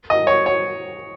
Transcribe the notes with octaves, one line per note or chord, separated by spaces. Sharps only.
D#5
C#5
C#5